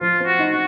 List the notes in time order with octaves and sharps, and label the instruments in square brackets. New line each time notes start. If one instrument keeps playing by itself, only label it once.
[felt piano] F3 [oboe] F4
[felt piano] C4
[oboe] F#4
[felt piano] D#4
[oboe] F#4